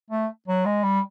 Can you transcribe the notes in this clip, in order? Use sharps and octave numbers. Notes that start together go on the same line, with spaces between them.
A3
F#3
G#3
G3